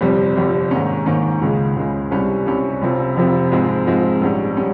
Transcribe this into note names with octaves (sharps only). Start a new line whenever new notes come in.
G1 F2 C3 G3
G1 F2 C3 G3
G#2 D#3 A#3 C#4
G#2 D#3 A#3 C#4
C#2 C#3 G#3
C#2 C#3 G#3
C2 C3 G3 C#4
C2 C3 G3 C#4
F1 F2 C3 F3
F1 F2 C3 F3
G#2 F3 G#3 C4
G#2 F3 G#3 C4
A#1 G#2 G3 C#4
G3 C#4